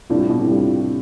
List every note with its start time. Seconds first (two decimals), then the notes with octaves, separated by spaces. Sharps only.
0.10 A2 C3 G3 D4 F4
0.20 A2
0.29 B2
0.39 A2 C3
0.48 G3 D4 F4